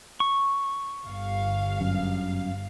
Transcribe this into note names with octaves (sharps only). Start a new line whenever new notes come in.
C#6
G1 F5
F#2